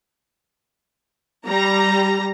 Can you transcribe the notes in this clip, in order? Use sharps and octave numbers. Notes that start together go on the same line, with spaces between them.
G3 A#5